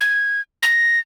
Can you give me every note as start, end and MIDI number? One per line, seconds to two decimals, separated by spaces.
0.01 0.41 92
0.63 0.99 94